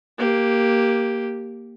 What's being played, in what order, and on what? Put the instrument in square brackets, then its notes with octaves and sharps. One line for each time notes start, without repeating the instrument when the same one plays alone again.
[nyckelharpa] A#3 G4